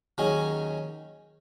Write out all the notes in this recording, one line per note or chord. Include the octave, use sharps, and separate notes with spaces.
D#2 D#3 F#3 C#4 G#4